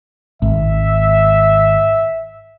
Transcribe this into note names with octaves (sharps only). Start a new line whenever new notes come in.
G#1 E5